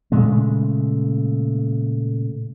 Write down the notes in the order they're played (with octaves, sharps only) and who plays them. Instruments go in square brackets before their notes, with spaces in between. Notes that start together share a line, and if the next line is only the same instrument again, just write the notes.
[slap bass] A#2 C#3 G#3 A3